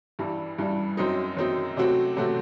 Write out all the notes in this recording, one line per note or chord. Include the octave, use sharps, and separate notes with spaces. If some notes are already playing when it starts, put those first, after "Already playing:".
G2 E3 G3
G2 E3 G3
F#2 F#3 C4 D#4
F#2 F#3 C4 D#4
C3 F#3 A3 C4 F#4
C3 F#3 A3 C4 F#4